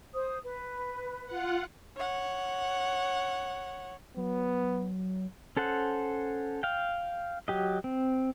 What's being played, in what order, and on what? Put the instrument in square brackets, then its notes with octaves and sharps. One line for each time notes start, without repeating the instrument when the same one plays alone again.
[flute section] C5 D#6
B4
[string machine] F4 F#5
[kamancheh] C#5 F#5
[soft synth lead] F#3 [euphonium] B3
[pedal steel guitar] C#4 A4 C5 F#5
F5 G5
F#3 G4 D#5
C4